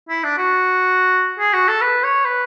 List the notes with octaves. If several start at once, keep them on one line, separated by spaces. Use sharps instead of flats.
E4
D4
F#4
G#4
F#4
A4
B4
C#5
B4